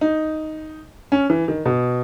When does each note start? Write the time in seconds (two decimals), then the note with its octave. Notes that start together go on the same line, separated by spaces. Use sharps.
0.01 D#4
1.12 C#4
1.30 E3
1.48 D#3
1.66 B2